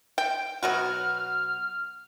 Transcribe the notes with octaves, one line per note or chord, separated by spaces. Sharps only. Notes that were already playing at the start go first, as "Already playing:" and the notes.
G5
B2 F#3 F#4 F6